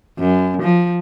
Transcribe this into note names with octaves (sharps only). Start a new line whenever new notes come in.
F#2
F3